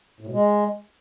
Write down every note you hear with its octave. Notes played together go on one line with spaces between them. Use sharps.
A2
B2
G#3